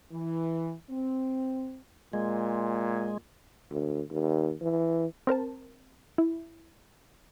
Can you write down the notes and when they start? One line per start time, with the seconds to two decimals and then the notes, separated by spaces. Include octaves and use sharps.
0.12 E3
0.90 C4
2.13 A#2 G#3
3.71 D2
4.10 D#2
4.61 E3
5.27 C4 A#4 C5 A5
6.18 E4